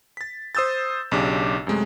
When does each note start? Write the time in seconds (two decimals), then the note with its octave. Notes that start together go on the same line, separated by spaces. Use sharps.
0.17 A6 B6
0.55 C5 D#6 E6 G6 A6
1.11 B1 C#3 D4 G4 D6
1.67 F#2 C3 G#3 A3